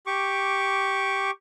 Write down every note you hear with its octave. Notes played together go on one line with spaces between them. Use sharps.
G4 C#6 D6